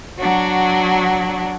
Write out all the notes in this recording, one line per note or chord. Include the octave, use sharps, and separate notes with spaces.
F#3 D4 F#4